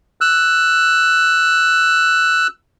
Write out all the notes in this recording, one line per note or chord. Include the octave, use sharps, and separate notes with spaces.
E6 F#6